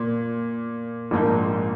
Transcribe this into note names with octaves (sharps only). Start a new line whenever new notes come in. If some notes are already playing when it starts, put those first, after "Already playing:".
Already playing: A#2
A#1 G#2 F3 A#3 D#4